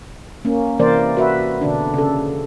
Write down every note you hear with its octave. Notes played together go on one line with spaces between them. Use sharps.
A#3 C#4
C3 E3 A#3 A#4 C5 D5
F#4 B4 E5
B2 D3 D4
C#3 A4